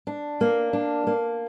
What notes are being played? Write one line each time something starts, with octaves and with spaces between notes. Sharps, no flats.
D4
A#3
D4
A#3